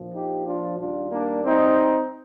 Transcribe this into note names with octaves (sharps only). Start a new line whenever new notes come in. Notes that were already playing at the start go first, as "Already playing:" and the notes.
Already playing: A#1 A#2 F3
D#4 G4
D4 F4
D#2 D#3 G3 D4 F4
A#3 D4
C4 D#4